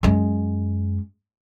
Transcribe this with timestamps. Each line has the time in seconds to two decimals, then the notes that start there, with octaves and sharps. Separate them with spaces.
0.03 F#2 G#3